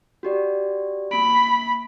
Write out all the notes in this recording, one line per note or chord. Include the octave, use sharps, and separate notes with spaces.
F#4 G4 D5
A#3 B5 D7